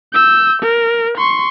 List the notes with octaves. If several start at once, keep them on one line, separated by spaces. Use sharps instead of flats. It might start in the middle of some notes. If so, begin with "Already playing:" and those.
E6 G6
A#4
C6 C#6